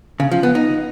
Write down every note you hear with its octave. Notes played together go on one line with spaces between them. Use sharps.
C#3
F3
B3
D#4